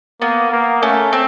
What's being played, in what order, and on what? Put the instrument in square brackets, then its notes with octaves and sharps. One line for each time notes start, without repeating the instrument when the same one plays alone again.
[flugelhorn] A#3 [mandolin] B3
[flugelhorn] A#3
[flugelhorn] A3 [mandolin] C#4
[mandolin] C4